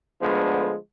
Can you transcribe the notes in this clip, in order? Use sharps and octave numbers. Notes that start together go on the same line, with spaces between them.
D2 D3 F3 G#3 B3